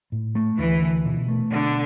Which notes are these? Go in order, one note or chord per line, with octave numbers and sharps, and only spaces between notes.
A2
A3
D2 E3
D3
B2
A3
B2 D3